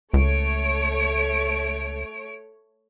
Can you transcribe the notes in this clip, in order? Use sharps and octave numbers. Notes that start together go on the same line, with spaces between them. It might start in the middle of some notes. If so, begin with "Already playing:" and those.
C#2 A3 C#5 D7